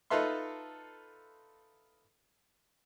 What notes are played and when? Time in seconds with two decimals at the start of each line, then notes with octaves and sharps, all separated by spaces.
0.10 D#4 F4 A4 B4 E5 C6